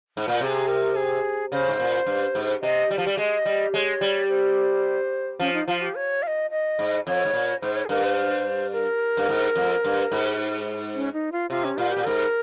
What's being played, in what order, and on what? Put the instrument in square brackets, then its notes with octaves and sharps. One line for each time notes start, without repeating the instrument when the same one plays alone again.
[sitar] G#2
A#2
[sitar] C3 [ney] G#4
[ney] A#4
G#4
[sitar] C#3 [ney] C5
[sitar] G#2
A#2
G2
G#2
[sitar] C3 [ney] D#5
[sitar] G3
F3
G3
[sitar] G#3 [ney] D#5
[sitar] G3
[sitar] G#3 [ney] C#5
[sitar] G3
[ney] C5
[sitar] F3 [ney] C#4
[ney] D#4
[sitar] F3 [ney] F4
[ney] G4
C#5
F5
D#5
D#5
[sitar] G#2
[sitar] F2 [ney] C#5
[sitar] G#2
A#2
[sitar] G#2 [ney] C5
[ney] C#5
G#4
[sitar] G2 [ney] A#4
[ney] C5
A#4
[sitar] G2
G#2
F2
G2
G#2
[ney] C#4
D#4
F4
[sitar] C3 [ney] F4
[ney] C#4
[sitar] A#2 [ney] F4
[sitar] A#2 [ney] G4
[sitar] G#2 [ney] A#4